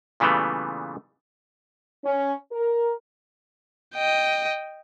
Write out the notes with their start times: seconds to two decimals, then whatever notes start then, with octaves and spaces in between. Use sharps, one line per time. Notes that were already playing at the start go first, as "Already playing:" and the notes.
0.20 A#2 C#3 E3 G3 A3 B3
2.04 C#4
2.52 A#4
3.95 D#5 G5